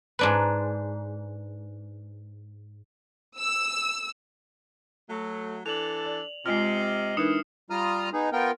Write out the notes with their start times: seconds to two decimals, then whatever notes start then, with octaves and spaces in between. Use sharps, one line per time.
0.19 G#2 D4 B4
3.39 E6
5.09 F#3 A3
5.66 E3 D4 A4 F7 F#7
6.06 D5
6.46 C3 G#3 F4 D#5 F6 C7
7.17 E3 D4 D#4 A#4 D#6 C#7 E7
7.70 G3 F4 A#5 D#6 F6
8.13 B3 D#4 G#4
8.32 B3 F4 A#4 G5